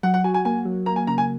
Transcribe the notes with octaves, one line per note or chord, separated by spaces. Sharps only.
F#3 F#5
F#5
F#4 G#5
G#5
A#3 G#5
F#3
A#3 A#5
G#5
C#3 A#5
G#5